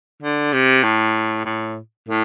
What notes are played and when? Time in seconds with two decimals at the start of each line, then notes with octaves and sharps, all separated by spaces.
0.23 D3
0.53 C3
0.83 A2
1.45 A2
2.08 A2